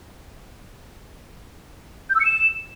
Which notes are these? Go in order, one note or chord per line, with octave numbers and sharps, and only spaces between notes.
G6
E6
C#7
E7